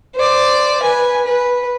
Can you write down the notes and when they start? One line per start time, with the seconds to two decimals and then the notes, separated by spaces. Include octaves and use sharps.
0.16 C5 D5
0.82 B4 G#5
1.25 B4